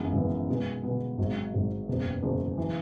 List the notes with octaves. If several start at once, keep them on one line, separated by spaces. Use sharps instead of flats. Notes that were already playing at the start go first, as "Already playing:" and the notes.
Already playing: G#1 F#2 C#3 E3 B3
G#1 F#2 C#3 E3 B3
B2 G#3 B3
B2 G#3 B3
G#1 G#2 F#3
G#1 G#2 F#3
F#1 E2 B2 F#3
F#1 E2 B2 F#3
E3